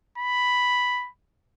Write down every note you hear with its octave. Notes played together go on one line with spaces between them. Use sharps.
B5